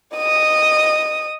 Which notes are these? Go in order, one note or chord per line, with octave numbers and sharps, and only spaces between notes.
D#5 D#6